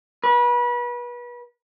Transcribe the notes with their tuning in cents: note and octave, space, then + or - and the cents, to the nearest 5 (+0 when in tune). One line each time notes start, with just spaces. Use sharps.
B4 -30